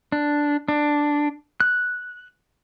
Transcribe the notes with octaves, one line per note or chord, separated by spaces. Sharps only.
D4
D4
F#6